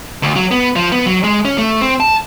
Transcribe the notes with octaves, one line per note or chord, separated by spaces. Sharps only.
D2
F#3
B3
F3
B3
F#3
G#3
C#4
A3
C4
A5